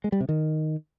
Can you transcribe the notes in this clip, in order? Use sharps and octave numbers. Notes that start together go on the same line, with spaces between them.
G#3
G3
C3
D#3